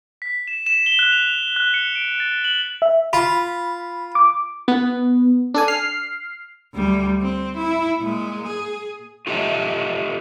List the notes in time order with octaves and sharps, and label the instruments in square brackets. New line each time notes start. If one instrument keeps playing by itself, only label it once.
[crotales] B6
E7
E7
G7
F#6
F7
F#6
C#7
D7
A6
F#7
[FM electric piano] E5
[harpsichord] F4 [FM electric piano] B5
[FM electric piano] D6
B3
D4 A4 G#5
F6 C7
[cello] D2 G3
C4
E4
A#2 G#3
G#4
[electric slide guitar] F4 G4 A4 C#5 D#5 E5